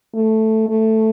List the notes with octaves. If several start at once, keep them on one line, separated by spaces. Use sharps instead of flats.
A3
A3